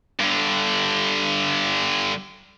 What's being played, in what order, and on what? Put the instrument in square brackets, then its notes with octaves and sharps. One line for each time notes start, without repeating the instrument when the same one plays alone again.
[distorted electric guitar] G2 D3